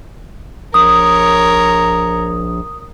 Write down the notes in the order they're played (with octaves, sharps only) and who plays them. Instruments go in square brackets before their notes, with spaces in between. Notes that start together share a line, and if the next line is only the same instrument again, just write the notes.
[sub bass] A#1 [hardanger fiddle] A#4 C#5 [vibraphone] D#6